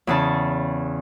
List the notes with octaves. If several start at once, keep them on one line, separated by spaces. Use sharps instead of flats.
E2 C#3 A5